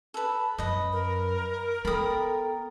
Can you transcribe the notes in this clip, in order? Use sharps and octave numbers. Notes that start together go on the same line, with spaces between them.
A4 B4
F#2 B4 D#5
A#4
B3 A4 G5 A#5 B5 D#6